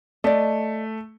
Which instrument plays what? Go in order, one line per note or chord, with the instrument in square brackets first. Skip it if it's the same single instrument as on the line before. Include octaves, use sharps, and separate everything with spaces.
[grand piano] A3 [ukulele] D5 D#5